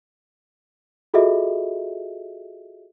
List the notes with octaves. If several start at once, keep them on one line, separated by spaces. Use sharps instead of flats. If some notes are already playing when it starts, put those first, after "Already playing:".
F4 F#4 G#4 A4 D#5 E5